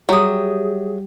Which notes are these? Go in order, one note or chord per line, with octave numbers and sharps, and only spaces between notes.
F#3 G3 G4 G#4 E5 D#6 G6